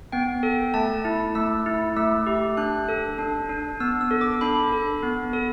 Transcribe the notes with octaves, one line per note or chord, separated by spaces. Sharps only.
B3 G5
A4
A3 A5
E4
A3 E6
E4
A3 E6
G4
D4 F#6
A4
D4
D4
B3 E6
E6
A4
D6
D4 B5
A4
B3
A4